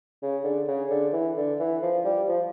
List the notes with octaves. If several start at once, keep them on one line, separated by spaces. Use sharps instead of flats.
C#3
D3
C#3
D3
E3
D3
E3
F3
G3
F3